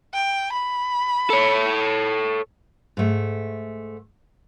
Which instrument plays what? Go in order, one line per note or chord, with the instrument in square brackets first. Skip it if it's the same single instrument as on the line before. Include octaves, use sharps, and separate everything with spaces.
[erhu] G5
B5
[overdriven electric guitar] A4 C#5
[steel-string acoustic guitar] G#2 A3